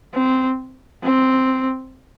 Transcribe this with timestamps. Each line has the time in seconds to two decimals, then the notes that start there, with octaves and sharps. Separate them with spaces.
0.15 C4
1.04 C4